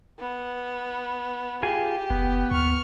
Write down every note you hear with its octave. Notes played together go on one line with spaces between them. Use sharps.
B3
F4 G4 G#4 G#5
F#1 B3
D#2 C#6 F6